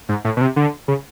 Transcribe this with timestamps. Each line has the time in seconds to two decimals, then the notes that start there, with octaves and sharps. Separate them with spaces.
0.09 G#2
0.25 A2
0.37 B2
0.41 C3
0.56 D3
0.88 C#3